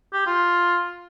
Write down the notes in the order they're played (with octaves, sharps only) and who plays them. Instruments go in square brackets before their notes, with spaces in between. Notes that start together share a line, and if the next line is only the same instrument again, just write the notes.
[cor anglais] G4
F4